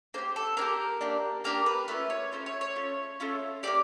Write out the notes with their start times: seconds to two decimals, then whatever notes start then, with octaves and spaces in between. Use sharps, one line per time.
0.14 A#3 D4 G4 C5
0.36 A4
0.57 A#3 D4 G4 A#4
1.01 A#3 D4 G4
1.44 A#3 D4 G4 A#4
1.66 B4
1.88 A3 C#4 F4 B4
2.10 C#5
2.32 A3 C#4 F4 C5
2.46 C#5
2.61 C#5
2.76 A3 C#4 F4
3.20 A3 C#4 F4
3.63 A#3 D4 G4 D5